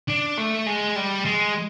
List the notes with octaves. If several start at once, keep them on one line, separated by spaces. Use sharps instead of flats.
D4
A3
G#3
G3
G#3